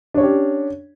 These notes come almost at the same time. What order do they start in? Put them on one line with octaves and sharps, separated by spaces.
D4 C#5 C#4 G4